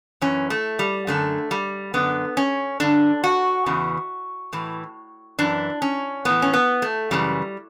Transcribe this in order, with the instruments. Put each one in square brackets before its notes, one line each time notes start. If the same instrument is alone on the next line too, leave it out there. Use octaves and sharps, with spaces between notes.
[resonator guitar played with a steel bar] F#2 E3 C#4
A3
G3
F#2 D3 A3
G3
F#2 D3 B3
C#4
G2 D3 D4
F#4
E2 C#3 E3
A2 E3
F#2 E3 D4
C#4
A2 E3 B3
C#4
B3
A3
F#2 C#3 E3 G3